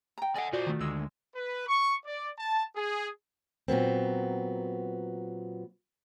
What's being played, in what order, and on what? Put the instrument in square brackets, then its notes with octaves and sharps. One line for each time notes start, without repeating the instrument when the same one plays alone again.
[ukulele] G5 A#5
[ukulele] A4 D#5 G#5 [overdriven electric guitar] D5 F#5
[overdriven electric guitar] B1 C5 [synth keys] F4 F#4 D5
[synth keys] D#3 A3
[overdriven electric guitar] D2 [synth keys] G#3 E6
[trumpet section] B4
C#6
D5
A5
G#4
[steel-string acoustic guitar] A#2 F#3 B3 C4